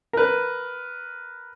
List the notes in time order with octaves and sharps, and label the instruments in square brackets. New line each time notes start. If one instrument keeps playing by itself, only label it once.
[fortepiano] A#4 B4